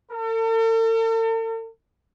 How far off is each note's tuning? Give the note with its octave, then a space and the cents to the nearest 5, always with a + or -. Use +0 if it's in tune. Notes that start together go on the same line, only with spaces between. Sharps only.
A4 +45